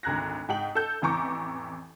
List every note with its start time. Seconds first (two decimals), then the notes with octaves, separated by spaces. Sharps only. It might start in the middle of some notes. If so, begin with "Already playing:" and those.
0.03 G#1 D2 A#5 F#6 G#6 A#6
0.49 G#2 G5 F#7
0.75 A4 G6
1.02 A1 F2 E3 A#5 C#6 D6